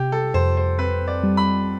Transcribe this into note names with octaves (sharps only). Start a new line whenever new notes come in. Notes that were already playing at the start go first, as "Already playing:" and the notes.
Already playing: C3 G4
A4
F2 C5
C5
C4 B4
D5
G3
B5